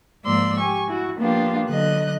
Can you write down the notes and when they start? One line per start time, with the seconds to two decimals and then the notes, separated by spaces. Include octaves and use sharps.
0.25 G#2 F3 A#3 D5 C6 E6
0.57 G4 G#5 C#6
0.88 E4 F#4
1.18 F3 A#3 B3 D4 F4 G4
1.68 D3 F#3 D#5 F#6